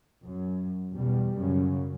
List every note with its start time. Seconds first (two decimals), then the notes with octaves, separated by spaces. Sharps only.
0.24 F#2
0.93 E2 B2 G3
1.36 F#2 C#3